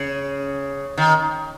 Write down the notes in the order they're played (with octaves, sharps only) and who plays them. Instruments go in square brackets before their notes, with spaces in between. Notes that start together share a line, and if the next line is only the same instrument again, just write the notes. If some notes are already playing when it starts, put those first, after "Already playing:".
Already playing: [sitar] C#3
D#3